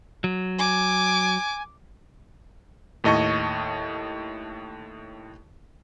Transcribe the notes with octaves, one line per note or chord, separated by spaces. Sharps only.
F#3
G#5 D6
D#2 A2 D#5 A5 C#6